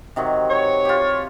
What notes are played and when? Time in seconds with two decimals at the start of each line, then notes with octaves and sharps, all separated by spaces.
0.16 C3 D#3 F#3
0.50 C#5
0.85 F4 G4